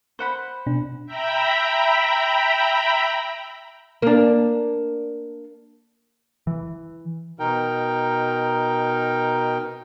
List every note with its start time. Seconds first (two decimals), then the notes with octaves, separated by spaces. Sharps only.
0.19 C5 F#5 B5
0.67 B2 D4
1.06 E5 G5 A#5 B5
4.02 A#3 D4
6.47 E3
7.39 B2 D#4 A#4 G5